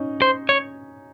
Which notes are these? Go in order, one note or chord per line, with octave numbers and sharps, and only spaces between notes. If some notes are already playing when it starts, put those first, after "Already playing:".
Already playing: C#4 D#4
C5
C#5